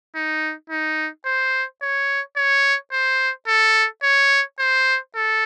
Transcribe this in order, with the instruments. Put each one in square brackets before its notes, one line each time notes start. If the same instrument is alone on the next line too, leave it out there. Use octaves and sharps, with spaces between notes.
[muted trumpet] D#4
D#4
C5
C#5
C#5
C5
A4
C#5
C5
A4